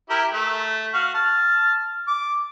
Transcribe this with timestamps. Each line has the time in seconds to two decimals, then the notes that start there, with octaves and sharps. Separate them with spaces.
0.10 E4 G4 A#4
0.34 A3
0.94 F#4 F5
1.14 A5 F6
2.08 D6